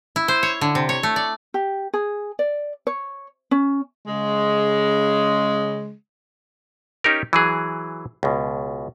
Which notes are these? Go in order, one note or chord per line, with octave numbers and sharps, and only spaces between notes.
E4
C5
C#5
D3
C3
C#5
A3
D5
G4
G#4
D5
C#5
C#4
C#3 G#3
C#4 D#4 G4 A#4
E3 F#3 G#4
C#2 B2